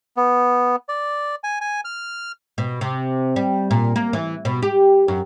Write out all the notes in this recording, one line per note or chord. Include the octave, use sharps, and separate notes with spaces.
B3
D5
G#5
G#5
F6
B2
C3
G3
A#2
A#3
E3
B2
G4
F#2